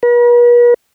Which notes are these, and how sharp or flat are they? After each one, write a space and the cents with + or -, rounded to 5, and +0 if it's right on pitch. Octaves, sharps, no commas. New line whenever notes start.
B4 -45